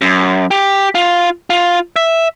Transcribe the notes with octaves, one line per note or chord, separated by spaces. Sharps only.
F#2
G4
F4
F4
E5